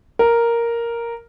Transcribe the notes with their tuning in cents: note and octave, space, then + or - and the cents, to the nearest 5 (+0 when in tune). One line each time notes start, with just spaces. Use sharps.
A#4 +0